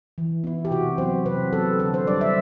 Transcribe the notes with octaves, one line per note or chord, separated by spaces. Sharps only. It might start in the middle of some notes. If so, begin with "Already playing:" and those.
E3
B3 E4
G4
C3 F#4
F#3 B3 C5
C3 B4
F#3 B3 A4
D3 A4
C5
G3 D4 D5
E5